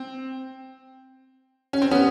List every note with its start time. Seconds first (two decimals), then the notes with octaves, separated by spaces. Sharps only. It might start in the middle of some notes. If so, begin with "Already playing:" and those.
Already playing: C4
1.73 C#4
1.82 C4
1.91 B3 C#4